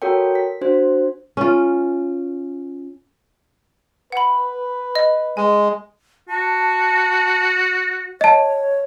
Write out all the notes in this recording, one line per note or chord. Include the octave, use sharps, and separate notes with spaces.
F#4 A4 A#4 C#5 G5
B6
D4 F#4 C5
C#4 F4
B4 F#5 B5
D#5
G#3 G#5
F#4 A5
C#5 D#5 A5